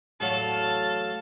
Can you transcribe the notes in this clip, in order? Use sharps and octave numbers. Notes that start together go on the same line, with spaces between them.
E2 A2 F#3 A4 F5